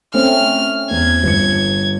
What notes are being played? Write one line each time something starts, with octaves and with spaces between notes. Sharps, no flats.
A3 C4 C#4 F6
E2 G#6
G1 B4 C#7